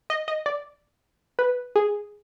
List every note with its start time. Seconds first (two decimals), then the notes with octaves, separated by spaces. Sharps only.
0.10 D#5
0.28 D#5
0.46 D5
1.39 B4
1.76 G#4